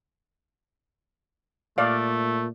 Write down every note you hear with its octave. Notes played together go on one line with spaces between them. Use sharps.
A#2 A3 D5 F5